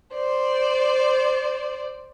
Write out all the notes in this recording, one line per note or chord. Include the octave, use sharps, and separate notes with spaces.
C5 D5